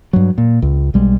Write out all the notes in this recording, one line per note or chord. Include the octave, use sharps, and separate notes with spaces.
G2 F#3
A#2
C#2
B1 G3 G#3